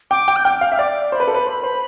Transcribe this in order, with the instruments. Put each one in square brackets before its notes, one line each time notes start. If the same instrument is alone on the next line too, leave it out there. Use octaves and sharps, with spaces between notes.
[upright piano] G5 [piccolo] D6
[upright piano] G5
[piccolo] G6
[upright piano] G5 [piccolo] F6
[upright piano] F5
E5
[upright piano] D5 [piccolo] D6
[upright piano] C5 [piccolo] B5
[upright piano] B4
A4
B4
C5
C5